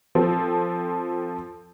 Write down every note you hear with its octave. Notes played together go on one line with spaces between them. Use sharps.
F3 C4 A4